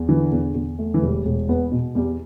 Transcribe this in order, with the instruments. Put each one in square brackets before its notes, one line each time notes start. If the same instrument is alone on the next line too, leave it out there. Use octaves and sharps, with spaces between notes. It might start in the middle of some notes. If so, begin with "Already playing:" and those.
Already playing: [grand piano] E2
[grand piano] D3 [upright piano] E3
[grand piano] E2
E2
A3
[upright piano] E3
[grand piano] E1 [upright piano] G3
[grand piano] E1
[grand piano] E2 [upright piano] B3
[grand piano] B2
[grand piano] E2 [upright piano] G3